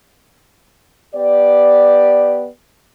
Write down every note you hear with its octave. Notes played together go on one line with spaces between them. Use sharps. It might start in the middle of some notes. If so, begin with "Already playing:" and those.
B3 G4 D5